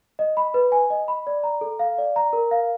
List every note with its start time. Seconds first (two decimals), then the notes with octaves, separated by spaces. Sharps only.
0.19 D#5
0.37 B5
0.54 B4
0.72 G#5
0.90 D#5
1.08 B5
1.27 D5
1.44 A#5
1.61 A4
1.79 F5
1.98 D5
2.16 A#5
2.33 A#4
2.51 F5